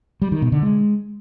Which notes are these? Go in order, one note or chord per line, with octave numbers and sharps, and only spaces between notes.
G3
D#3
B2
D3
G#3